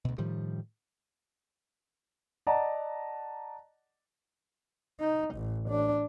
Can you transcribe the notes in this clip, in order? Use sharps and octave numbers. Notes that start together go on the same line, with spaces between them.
D2 B2
A2 D#3 F3 G3
D5 D#5 F#5 A5 A#5
D#4
A1
D4